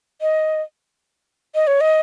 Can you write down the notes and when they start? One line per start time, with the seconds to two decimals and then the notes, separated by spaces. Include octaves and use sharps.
0.21 D#5
1.55 D#5
1.67 C#5
1.81 D#5